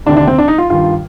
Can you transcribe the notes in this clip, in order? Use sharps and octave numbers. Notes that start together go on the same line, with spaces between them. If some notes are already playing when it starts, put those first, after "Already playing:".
D2 C3 D#3 D4
D4
C4
D4
D#4
F4
G2 D#3 F4